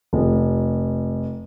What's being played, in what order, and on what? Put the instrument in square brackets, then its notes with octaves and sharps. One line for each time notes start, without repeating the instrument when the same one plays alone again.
[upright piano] F1